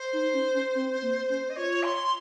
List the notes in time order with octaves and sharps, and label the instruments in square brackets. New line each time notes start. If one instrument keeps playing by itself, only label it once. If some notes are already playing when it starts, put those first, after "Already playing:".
Already playing: [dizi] C5
[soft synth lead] D#4
C#4
C#4
C4
A#3
C#4
[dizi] D#5
[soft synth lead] F4 [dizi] C#5
[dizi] C6